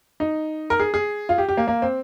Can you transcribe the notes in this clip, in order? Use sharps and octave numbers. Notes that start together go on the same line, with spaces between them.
D#4
A#4
G#4
G#4
F4
G4
G4
A#3
A#3
C4